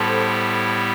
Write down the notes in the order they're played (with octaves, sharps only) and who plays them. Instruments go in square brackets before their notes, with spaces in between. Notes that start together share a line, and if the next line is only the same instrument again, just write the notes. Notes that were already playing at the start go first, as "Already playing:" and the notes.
Already playing: [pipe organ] A2 G3 B3 E4 G4 [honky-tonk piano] A4 C5